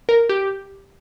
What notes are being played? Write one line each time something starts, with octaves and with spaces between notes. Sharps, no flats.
A#4
G4